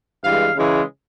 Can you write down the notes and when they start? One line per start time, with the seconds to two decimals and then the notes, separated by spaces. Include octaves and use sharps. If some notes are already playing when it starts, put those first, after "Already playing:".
0.24 G2 E3 G#3 F5
0.56 C#3 E3 G#3